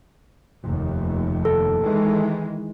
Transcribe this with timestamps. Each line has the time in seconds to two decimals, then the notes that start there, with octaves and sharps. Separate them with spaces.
0.63 F1 D#2
1.45 A4
1.82 D#3 E3 G#3